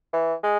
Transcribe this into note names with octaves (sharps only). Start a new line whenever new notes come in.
E3
G#3